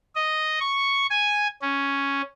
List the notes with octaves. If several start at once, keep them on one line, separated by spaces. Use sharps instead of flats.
D#5
C#6
G#5
C#4